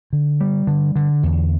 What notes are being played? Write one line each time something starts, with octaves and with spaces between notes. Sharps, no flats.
D3
G3
D3
D3
E2